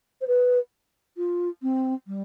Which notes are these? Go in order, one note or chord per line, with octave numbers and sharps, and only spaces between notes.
C5
B4
F4
C4
G3